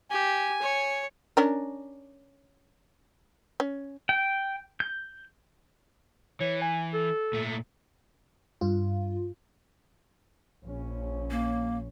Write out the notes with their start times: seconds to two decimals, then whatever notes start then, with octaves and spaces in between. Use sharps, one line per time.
0.11 G4 G#5
0.62 C#5
1.37 C#4 D4 A#4
3.60 C#4
4.09 G5
4.80 G6
6.41 E3 C#5
6.62 G#5
6.94 A4
7.33 A#2 A3
8.61 G2 F4
10.61 A#1 C#4
11.30 A#3